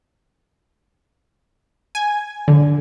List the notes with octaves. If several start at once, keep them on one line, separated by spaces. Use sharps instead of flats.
G#5
D3